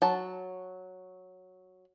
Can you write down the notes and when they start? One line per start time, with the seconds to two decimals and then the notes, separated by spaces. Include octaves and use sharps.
0.02 F#3 A5